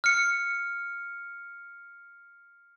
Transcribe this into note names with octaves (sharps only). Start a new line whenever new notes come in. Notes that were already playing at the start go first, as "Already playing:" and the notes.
F6 C#7